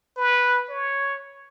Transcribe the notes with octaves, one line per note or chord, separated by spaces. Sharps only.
B4
C#5